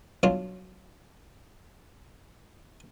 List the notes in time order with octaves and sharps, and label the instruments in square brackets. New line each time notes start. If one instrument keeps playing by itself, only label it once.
[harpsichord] B1 F#3 D4 F4